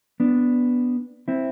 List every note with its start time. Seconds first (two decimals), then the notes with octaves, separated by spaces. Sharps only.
0.20 B3 D4
1.28 C4 E4